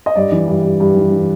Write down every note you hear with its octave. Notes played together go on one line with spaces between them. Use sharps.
D#5
G2 D5
E3
G2
G2
G2
E3
E3